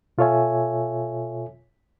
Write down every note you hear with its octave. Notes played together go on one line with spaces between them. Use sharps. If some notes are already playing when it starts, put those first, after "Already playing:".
B2 F4 A4 C#5 E5 G#5